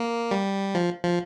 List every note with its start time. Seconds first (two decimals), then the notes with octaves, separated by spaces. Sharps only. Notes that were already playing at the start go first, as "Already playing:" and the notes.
Already playing: A#3
0.31 G3
0.75 F3
1.04 F3